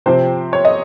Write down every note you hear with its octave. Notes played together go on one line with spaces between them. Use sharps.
C3 F3 C4 C5
C#5
D#5